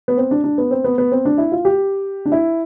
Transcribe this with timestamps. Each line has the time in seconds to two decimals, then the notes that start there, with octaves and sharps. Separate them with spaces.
0.08 B3
0.18 C4
0.31 D4
0.44 D4
0.58 B3
0.71 C4
0.84 B3
0.98 B3
1.12 C4
1.25 D4
1.38 E4
1.52 F4
1.65 G4
2.25 D4
2.32 E4